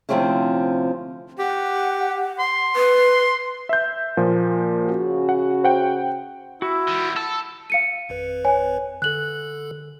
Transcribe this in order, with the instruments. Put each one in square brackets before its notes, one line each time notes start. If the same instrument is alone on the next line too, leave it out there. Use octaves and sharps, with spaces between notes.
[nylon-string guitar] D2 C3 F3 C4 C#4 E4
[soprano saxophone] G4 [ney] F#5
[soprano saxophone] C6
[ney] B4
[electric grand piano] E5 G6
A#2 F3 A#3
[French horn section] C#3 F#4
[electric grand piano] F#5
C5 F#5 G5
[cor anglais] E4 [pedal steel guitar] F#4
[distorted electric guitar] D#3 G3
[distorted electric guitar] A4 [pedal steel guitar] E6
[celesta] F5 C#7 D#7
[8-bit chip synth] G#1 F2 B4
[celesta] C#5 G#5
[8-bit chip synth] D3 A4 [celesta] F#6 F#7